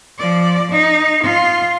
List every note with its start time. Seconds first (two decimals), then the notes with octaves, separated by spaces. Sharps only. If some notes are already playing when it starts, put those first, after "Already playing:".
0.19 F3 D5
0.71 D#4
1.23 F4